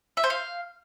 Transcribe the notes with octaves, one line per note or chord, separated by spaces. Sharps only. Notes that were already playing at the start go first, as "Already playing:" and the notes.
E5
C5
F5